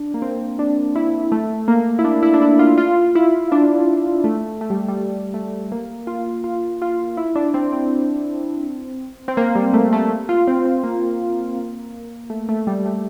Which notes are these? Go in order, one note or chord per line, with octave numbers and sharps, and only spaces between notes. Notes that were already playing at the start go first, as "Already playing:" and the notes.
Already playing: D4
A#3
C4
D4
E4
A3
A#3
E4
D4
E4
D4
E4
F4
F4
E4
D4
A3
A3
G3
G3
A3
A3
A#3
F4
F4
F4
E4
D4
C4
C4
C4
A#3
G3
A3
A3
F4
C4
C4
A#3
A3
A3
G3
A3